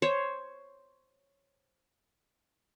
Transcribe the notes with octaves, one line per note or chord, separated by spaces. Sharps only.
C5 C#5